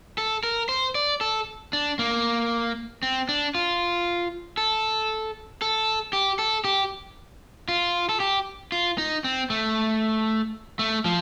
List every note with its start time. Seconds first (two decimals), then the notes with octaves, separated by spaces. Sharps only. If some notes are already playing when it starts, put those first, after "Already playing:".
0.18 A4
0.43 A#4
0.69 C5
0.95 D5
1.21 A4
1.73 D4
1.99 A#3
3.03 C4
3.29 D4
3.55 F4
4.58 A4
5.62 A4
6.13 G4
6.39 A4
6.64 G4
7.68 F4
8.09 A4
8.20 G4
8.72 F4
8.98 D#4
9.24 C4
9.50 A3
10.79 A3
11.05 F3